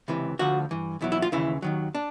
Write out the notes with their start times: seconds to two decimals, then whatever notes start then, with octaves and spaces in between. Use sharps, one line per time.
0.08 C#2 C3 E3
0.39 D2 D3 F3 F#4
0.71 G2 E3
1.01 E2 B2 F#3 E4
1.12 E4
1.22 F4
1.32 D#2 C#3 E3 E4
1.62 D#2 D#3 F#3
1.95 D4